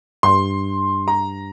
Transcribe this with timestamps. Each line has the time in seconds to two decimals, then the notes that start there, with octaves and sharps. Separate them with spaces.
0.23 G2 C6
1.08 A#5